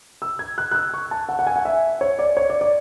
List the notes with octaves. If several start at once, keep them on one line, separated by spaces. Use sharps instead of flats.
E6
G#6
F#6
F#6
E6
C#6
A5
F#5
F#5
G#5
F#5
E5
C#5
D5
C#5
D5
D5